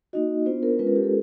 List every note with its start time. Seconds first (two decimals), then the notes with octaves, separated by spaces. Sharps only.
0.13 A#3 D#4 F#4 D#5
0.46 B3 D4 F4 C5
0.63 A#4
0.79 G#3 C#4 F4 B4
0.87 A#4
0.96 G4
1.03 A4